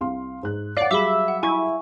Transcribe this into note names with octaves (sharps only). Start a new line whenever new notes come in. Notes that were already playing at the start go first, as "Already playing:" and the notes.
C2 F5 C6
G#2 F#6
C#5 D5 F5 F#5
F#3 G3 G#4 E5 B5 D6
F#5
E4 G#5 C#6